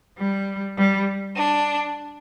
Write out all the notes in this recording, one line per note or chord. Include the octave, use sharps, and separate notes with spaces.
G3
G3
D4